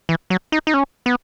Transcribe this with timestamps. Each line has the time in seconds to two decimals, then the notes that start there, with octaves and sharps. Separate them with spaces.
0.09 E3
0.30 F#3
0.52 D#4
0.67 D#4
0.74 C#4
1.06 B3